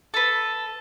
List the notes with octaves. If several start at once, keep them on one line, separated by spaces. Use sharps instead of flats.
A4 B4